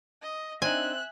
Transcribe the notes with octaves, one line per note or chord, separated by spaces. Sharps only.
D#5
C4 D4 D#4 E5 G#5 F#6